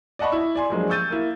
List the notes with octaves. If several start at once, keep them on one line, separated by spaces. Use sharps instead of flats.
D5 D#5 F#5 A5 B5 C#6
E4
D5 G#5 C6
F3 F#3 G#3 A#3 D4
C#6 E6 G6 A6 D#7
A#3 E4